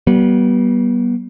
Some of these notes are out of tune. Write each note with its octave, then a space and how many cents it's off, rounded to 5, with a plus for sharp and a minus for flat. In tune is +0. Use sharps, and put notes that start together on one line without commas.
G3 -40 B3 -35